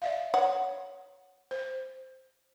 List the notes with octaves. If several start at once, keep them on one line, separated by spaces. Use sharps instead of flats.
D5 E5 F5
C#5 F#5
C5